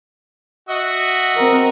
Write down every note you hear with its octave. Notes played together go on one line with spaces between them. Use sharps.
F#4 D#5 E5
C4 A#4